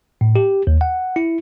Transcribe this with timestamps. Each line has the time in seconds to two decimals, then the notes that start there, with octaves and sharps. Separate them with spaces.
0.21 A2
0.36 G4
0.67 D#2
0.81 F#5
1.16 E4